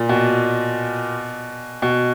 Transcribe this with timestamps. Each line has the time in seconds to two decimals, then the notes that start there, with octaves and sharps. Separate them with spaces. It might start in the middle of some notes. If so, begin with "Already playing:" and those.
Already playing: A#2
0.09 B2
1.82 B2